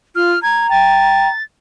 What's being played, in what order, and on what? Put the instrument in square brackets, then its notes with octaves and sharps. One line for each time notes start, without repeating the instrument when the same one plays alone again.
[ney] F4 [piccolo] F6
[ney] A#5 [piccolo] G#6
[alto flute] G5 [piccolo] A6